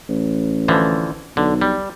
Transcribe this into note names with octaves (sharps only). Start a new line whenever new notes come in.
A1
D3 E3 F3
B1 D3
G3